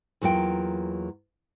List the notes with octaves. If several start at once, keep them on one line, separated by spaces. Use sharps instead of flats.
E2 F#3 A#3 F4 G5